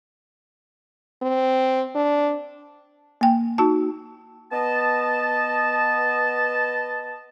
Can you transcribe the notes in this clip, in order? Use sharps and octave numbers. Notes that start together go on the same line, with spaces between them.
C4
D4
A#3 G5
D#4 F#4 A5
B3 D#5 A5